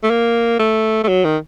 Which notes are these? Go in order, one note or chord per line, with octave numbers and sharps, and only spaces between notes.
A3
A#3
A3
A3
F#3
D#3